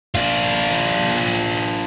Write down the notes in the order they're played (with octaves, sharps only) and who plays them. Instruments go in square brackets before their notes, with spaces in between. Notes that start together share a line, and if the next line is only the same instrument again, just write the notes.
[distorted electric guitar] D4 F4